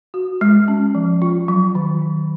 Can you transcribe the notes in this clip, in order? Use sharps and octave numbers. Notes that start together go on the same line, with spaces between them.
F#4
G#3
C#4
F3
F4
F#3
D#3
F#3